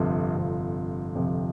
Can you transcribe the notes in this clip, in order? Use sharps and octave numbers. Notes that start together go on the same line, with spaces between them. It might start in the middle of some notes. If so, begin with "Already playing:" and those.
Already playing: G1 F2 C3 F3
G1 F2 C3 F3
G1 F2 C3 F3